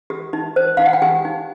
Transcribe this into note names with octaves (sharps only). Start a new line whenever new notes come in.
G4
D#4
C5
D#4 F5
F#5
G5
G4 G#5
D#4